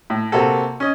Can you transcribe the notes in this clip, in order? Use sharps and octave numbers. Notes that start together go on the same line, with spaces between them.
A2
C3 A#3 F#4 A4
C#4 D#5